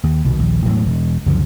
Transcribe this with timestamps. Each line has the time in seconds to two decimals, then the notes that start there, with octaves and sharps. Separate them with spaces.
0.04 D#2
0.24 C2 B2 D#3
0.39 A#1 D#2
0.65 E1 A2 E3 F#3
0.85 E1
1.26 C#2 F#2 D3 F3